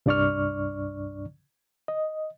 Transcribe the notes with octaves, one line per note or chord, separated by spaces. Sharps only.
C2 G2 D4 D5 C#6 F6
D#5